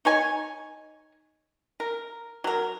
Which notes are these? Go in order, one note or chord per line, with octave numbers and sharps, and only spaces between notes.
D#4 C#5 G#5 C#6
A#4
F#3 A#4